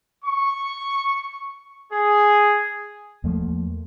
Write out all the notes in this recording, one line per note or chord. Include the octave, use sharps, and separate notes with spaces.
C#6
G#4
E2 F3 A3 A#3